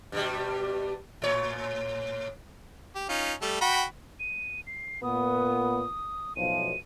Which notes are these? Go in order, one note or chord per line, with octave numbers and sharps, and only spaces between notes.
G2 B2 G3
A2 C#5
G4
C#4 D#4 F4
G3 A3 A4
F#4 G5 B5
D#7
C7
A#2 B3 D#6
B1 A2 F3 D#7